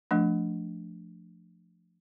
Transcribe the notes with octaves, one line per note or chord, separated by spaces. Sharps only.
F3 A3 D4